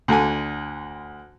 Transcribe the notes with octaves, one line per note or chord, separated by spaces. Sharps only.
D2 D3 G#5